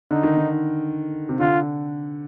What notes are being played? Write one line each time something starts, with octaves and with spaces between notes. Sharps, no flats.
D3 D#4
D#3
D3
C3
D3 F4